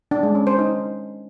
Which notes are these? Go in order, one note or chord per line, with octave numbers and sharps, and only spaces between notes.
D4
G#3
C#4
C5
D#4